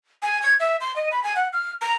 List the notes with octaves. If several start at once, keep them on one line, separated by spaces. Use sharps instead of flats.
G#5
G#6
E5
C6
D#5
B5
G#5
F#5
F6
A#5